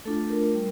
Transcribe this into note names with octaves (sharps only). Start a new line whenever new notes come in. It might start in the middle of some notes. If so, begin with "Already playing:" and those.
A3 D4 F4 A4
A#4
G3